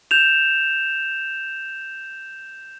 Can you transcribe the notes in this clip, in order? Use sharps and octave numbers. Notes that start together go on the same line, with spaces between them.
G6 E7 F7